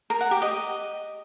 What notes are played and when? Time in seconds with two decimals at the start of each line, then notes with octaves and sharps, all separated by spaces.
0.10 A#4
0.21 F#5
0.31 G4
0.42 D#5